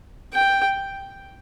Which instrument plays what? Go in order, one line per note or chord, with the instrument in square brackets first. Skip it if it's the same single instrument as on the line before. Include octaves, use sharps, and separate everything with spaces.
[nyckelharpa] G5